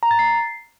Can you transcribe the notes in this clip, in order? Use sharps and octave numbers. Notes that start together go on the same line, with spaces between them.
A#5
A6
C7